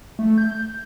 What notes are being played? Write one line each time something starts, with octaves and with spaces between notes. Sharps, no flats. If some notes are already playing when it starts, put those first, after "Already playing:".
A3
G6